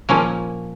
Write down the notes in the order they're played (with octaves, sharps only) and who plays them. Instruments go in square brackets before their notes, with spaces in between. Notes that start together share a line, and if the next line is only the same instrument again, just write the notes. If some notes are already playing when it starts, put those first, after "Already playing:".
[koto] A#2 F3 A#3 C#4